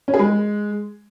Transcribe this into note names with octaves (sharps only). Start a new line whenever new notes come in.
C#4
G#4
G#3